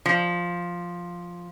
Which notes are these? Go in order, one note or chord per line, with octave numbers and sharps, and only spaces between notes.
F3